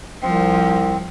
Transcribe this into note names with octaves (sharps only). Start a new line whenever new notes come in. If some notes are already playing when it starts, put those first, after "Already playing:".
C2 F3 C4